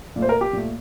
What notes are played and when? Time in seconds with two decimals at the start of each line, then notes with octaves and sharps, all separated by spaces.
0.16 A#2 A3
0.22 C5
0.29 A#4
0.41 G4
0.53 A#2 A3